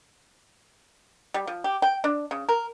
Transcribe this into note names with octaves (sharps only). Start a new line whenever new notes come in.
G3
F3
G4
G5
D4
C#3
A#4